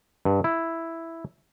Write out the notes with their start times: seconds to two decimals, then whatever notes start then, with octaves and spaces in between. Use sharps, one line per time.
0.25 G2
0.44 E4